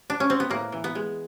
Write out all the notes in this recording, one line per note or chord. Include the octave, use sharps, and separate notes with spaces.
D4
C#4
C4
B3
A2 A#3
E3
B3
G#3